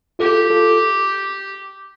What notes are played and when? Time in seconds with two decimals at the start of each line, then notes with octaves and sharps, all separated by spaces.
0.19 F4 G4 A4
0.50 F4 A4